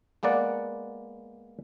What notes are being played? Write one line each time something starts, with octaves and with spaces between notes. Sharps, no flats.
G#3 A#3 B3 D5 F#5